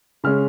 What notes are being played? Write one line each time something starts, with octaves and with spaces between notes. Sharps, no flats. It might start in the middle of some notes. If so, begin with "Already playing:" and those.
C#3 G#3 C#4 F6